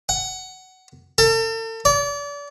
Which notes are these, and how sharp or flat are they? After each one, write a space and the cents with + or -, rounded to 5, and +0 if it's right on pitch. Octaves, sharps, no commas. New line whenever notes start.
F#5 +20
A4 +40
D5 -35